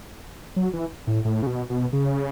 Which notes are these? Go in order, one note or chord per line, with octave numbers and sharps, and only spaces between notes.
F#3
E3
A2
A2
C#3
B2
B2
C#3